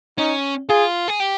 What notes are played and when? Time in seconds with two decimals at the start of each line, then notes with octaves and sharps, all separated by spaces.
0.18 C#4 D#4
0.69 F4 G#4
1.08 G#4
1.20 G4